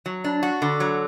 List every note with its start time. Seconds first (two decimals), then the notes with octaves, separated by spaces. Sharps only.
0.06 F#3
0.24 D4
0.43 F#4
0.62 D3
0.80 F#3